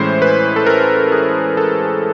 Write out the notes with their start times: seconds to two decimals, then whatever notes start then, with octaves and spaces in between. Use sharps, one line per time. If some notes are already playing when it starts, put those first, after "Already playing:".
Already playing: A2 E3 G#3 C#4 E4 C5
0.22 B4
0.56 A4
0.66 A#4
1.12 G#4
1.57 A4